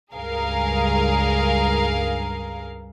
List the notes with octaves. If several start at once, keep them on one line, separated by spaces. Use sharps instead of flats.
C#2 G2 G#4 A#4 F5